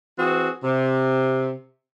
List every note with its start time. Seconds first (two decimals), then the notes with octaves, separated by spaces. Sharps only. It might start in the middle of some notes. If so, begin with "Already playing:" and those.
0.19 E3 C4 F#4 G#4
0.64 C3